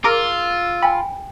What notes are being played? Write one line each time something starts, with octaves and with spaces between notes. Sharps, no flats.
F4 G#4 A#4 A#5 D6 E6
G5 G#5 B5